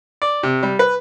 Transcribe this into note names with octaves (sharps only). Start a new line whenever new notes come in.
D5
C3
G3
B4